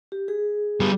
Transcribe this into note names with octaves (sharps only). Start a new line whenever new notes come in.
G4
G#4
G3 B3